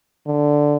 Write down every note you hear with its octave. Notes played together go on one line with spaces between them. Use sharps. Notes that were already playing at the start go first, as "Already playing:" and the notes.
D3